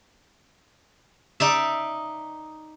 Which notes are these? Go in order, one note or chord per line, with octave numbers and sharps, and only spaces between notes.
D#4 D5 E5